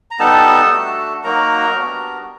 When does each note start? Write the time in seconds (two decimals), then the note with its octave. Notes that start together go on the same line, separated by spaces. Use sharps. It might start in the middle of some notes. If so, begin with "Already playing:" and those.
0.11 A#5
0.19 G3 B3 D#4 A4 A5
0.71 A3 D4 F#4
1.24 F#3 A#3 D#4 F#4 A#4 A#5
1.76 G3 B3 D4 F#4